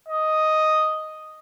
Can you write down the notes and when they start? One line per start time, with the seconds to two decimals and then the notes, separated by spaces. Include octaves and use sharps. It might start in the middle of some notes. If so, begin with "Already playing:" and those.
0.09 D#5